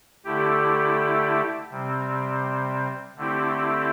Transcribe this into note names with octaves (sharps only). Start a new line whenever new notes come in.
D3 A3 E4 G4
C3 G3 C4
D3 A3 C4 E4 G4